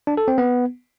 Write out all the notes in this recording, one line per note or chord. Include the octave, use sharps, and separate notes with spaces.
D4
A4
C4
B3